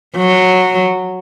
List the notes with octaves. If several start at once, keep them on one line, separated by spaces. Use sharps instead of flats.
F#3